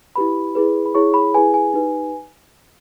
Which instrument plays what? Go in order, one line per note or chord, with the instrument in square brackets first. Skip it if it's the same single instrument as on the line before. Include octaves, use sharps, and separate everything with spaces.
[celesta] E4 G4 B4 B5
E4 G#4 B4
B5
E4 G#4 C#5 C#6
B5
E4 G#4 B4 G#5
G#5
D#4 G4 B4